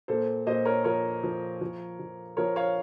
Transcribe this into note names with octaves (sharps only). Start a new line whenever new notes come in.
A#2 A4 C5
A#2 C5 D#5
A#4 C#5
F3 A#4 C#5
F3
F3
F3
F3 A#4 C#5
C#5 F5